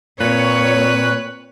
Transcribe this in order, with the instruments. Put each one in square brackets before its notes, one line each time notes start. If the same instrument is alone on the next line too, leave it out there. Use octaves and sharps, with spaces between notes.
[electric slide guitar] A#2 [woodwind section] C4 [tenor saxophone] B4 [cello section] C#5